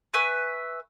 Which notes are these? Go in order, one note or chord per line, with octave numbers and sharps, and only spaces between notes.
B4 E5 G#5 C#6